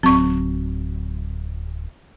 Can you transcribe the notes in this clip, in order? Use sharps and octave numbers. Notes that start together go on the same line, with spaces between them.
D1 A#1 F#3 C4 C#6